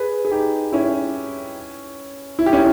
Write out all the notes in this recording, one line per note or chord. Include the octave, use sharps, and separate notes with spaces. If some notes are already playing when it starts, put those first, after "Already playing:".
Already playing: G#4 B4
G#4
D#4 G4
C#4 E4
E4
G4
C#4 E4